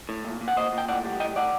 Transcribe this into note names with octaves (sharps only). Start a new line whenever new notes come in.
A2
A#2
A#2
F#5
A#2 C5 D#5
A#2
G5
A2 D5 F#5
G3
A2 D#5 G5
A2 D5 F#5